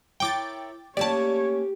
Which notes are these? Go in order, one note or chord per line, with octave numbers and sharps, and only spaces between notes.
E4 A#4 C#5 G5 D6 A6
A3 A#3 C#4 G4 C#5 D5 A5